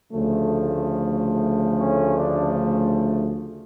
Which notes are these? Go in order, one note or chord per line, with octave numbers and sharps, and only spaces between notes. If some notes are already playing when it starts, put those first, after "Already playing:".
D2 C#3 F3 A3
C#4
D4